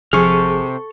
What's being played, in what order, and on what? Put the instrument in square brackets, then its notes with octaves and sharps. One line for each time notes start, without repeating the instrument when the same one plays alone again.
[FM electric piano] G#1 F3 [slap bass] C3 [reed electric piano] G#4 [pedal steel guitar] A4 C#6 F6